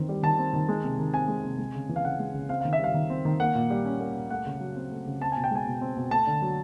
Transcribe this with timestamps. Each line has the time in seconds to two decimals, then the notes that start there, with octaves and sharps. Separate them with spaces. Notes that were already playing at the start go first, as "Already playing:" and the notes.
Already playing: D#3 E3 C4
0.09 G3
0.23 D#3 A5
0.39 C4
0.54 D#3
0.69 G#3
0.84 C3
0.99 D#3
1.13 C4 G#5
1.28 G#3
1.44 C3
1.58 G#3
1.75 C#3
1.89 E3
1.96 F5
2.05 C#3 F#5
2.19 G#3
2.34 C#3
2.49 C4 F5
2.61 D#3 F5
2.73 E5
2.79 G3 F5
2.94 D#3
3.10 C4
3.25 D#3
3.40 A#3 F#5
3.55 A#2
3.70 G3
3.85 C#4
4.00 A#3
4.16 A#2
4.30 A3 F#5
4.46 C#3
4.61 F#3
4.76 C4
4.91 A3
5.06 C#3
5.21 C4 A5
5.32 B2 G#5
5.44 G5
5.51 G#3 G#5
5.67 B2
5.81 C4
5.96 B2
6.11 A3 A5
6.27 D3
6.42 F#3